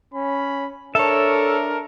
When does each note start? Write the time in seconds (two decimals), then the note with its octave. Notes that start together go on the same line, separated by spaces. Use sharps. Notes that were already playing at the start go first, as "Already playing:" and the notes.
0.14 C#4 B5
0.95 D4 A4 A#4 C#5 E5